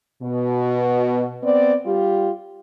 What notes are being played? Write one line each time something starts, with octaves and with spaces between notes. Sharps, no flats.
B2
B3 C4 D5
G3 F4 G4